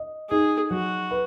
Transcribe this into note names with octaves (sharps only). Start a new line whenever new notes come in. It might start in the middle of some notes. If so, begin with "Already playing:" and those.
Already playing: D#5
D#4 G#4
F#3 F#4
B4